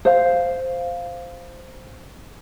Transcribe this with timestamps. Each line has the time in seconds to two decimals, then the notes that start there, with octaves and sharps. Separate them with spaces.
0.05 C5 F5